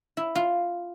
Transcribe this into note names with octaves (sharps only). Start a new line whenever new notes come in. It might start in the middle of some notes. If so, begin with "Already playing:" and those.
E4
F4